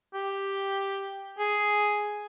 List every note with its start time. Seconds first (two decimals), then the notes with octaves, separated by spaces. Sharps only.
0.14 G4
1.39 G#4